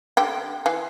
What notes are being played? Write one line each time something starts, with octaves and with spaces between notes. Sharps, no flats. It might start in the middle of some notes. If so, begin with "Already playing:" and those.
D3 G4 G5
E3 F5